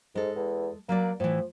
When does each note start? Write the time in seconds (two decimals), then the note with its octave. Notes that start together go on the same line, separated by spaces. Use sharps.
0.16 G#2 G#3 A4
0.36 E2
0.89 F#3 A#3 B4 D5
1.20 A2 E3 F3